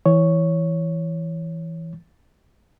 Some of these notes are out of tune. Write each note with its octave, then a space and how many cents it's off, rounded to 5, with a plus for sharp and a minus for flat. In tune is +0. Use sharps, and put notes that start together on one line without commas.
E3 +0 C#5 +0